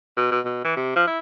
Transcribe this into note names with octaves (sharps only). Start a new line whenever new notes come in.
B2
B2
B2
E3
C3
F3
E4